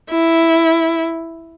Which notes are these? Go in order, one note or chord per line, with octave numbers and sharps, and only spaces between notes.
E4